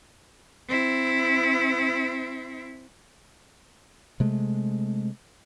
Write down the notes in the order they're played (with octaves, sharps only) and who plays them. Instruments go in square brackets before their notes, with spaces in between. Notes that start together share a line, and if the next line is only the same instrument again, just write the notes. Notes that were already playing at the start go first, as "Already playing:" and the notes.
[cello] C4 E4
[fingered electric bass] C3 G#3 A3